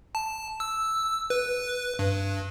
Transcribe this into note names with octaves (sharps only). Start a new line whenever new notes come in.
A5
E6
B4
G2